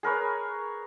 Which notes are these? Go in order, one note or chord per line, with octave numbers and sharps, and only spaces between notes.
G#4 A#4 B4 C#5